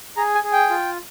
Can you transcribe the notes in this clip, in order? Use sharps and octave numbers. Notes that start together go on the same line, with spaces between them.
G#4 A#5
G#5
G#4
G5
F4